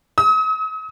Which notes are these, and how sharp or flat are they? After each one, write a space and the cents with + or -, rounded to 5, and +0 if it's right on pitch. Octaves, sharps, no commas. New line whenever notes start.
D#6 +45